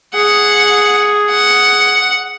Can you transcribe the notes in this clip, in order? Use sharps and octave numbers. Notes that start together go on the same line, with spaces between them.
G#4 F#5
F#5